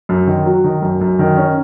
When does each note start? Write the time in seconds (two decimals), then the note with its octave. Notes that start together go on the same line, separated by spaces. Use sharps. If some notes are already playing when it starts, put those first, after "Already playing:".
0.09 F#2
0.27 D#3
0.46 F#3
0.64 D#3
0.82 F#2
1.01 F#2
1.19 D#3
1.37 C#4